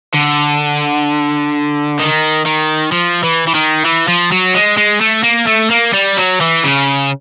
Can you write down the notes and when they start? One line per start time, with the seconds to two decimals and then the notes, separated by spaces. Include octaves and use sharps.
0.14 D3
2.00 D#3
2.46 D#3
2.92 F3
3.23 E3
3.47 E3
3.55 D#3
3.85 E3
4.08 F3
4.32 F#3
4.55 G#3
4.78 G#3
5.01 A3
5.24 A#3
5.48 A3
5.71 A#3
5.94 G3
6.17 F#3
6.41 E3
6.64 C#3